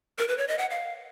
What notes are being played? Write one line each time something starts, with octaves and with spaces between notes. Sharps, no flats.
A#4
B4
C#5
D#5
F#5
F5